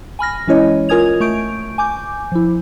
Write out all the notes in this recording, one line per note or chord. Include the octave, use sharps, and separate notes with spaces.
G#5 B5 F6 A#6
E3 G#3 C#4 E4 C#5 D#5
F4 A#4 G#5 D#6 G#6 F7
A3 C#6 G6 D7
G#5 D6 G6
F3 E4